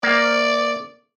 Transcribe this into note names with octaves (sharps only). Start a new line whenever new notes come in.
A#3 D5